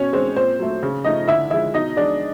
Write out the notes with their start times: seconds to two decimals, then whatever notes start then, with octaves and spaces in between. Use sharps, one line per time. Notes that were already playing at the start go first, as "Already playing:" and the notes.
Already playing: B2 C#4 C#5
0.13 G#3 C4 C5
0.36 A#2 C4 C5
0.59 F#3 A3
0.83 C#3
1.04 F3 A3 D#4 D#5
1.28 D3 E4 E5
1.50 F3 G#3 E4 E5
1.74 B2 D#4 D#5
1.96 G#3 D4 D5